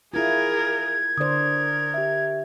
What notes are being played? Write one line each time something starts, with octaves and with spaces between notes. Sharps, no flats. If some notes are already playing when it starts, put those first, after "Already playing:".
E4 F4 G#4 A#4 G#6
D3 A#4 C5 D5 D#6
G4 E5